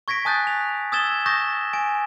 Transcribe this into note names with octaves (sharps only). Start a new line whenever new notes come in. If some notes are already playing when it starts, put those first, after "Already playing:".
C#6 G#6 A#6 B6 D7
G#5 A5 D#6 F#6 G6 A6
F7
D#6 E6 G#6 A6 E7 G7
C#6 D#6 G6 A6 A#6
G#5 D7